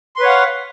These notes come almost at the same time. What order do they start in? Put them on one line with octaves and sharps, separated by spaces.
C6 B4 C#5 F#5 F5